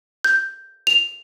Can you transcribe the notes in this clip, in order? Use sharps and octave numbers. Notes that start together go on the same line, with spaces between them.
G6
F7